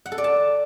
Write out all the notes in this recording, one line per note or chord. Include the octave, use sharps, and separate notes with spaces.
F#5
A4
D5
A5